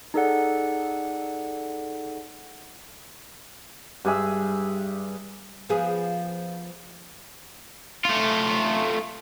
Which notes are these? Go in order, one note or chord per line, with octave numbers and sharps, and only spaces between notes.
D#4 G#4 A4 D5 F#5
G2 G#4 E5
F3 B3 G#4
A3 F4